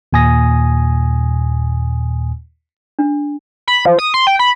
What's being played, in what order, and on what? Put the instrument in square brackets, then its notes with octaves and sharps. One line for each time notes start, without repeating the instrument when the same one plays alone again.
[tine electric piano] D#2 A#2 G#5 D#6 A#6
[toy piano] D4
[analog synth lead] B5
F3
D#6
C6
G5
B5